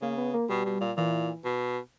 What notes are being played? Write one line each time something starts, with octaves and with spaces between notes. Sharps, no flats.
C#3 A#3
B3
A#3
B2 G3
B2
A#2
A#2 E3
B2